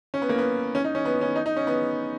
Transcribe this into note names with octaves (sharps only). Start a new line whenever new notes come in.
C#4
B3
A#3
B3
C#4
D#4
C#4
B3
C#4
D#4
D#4
C#4
B3